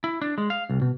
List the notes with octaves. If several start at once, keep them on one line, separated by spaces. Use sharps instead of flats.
E4
D4
G#3
F5
C2
B2